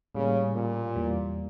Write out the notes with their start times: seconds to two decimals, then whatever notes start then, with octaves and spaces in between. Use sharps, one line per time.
0.15 A2 C#3 G3 A#3
0.55 A#2
0.95 E2 E3 G3 A#3